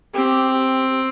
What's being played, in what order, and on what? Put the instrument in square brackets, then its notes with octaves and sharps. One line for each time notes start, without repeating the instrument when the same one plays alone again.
[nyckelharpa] C4 [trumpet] G4
[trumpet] G4